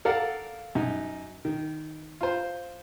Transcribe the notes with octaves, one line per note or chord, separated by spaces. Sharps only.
A4 A#4 D5 F5 F#5
F#2 D#4
D#3
F4 C5